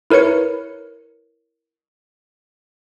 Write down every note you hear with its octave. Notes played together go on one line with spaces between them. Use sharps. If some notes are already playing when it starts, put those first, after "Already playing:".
E4 A#4 B4 C#5 C#7